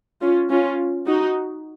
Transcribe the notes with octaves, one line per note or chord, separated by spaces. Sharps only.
C#4 F4
C#4 F4
D#4 F#4